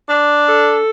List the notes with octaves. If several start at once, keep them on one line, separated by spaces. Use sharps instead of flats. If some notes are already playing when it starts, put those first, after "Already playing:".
D4
A4